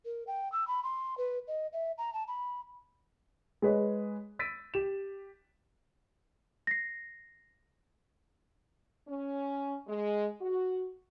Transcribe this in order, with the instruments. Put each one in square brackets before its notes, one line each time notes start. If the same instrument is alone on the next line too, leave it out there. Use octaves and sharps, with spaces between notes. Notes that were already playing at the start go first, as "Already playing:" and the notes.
[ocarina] A#4
G5
E6
B5
C6
B4
D#5
E5
A#5
A5
B5
[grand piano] G#3 G#4 B4 C#5 D#5
E6 A6 B6 D7 D#7
G4 E7
[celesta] A#6 C7
[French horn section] C#4
G#3
F#4